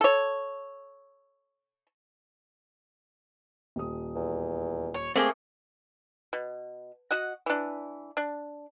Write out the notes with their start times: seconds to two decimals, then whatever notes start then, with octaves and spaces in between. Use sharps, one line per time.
0.01 A4 C#5
3.76 D#1 G4 D#6
4.15 E2
4.94 C#5
5.16 A3 A#3 C4 G#4 D6 D#6
6.33 B2
7.11 F#4 D#5 F#5
7.46 E3 D4
8.17 D4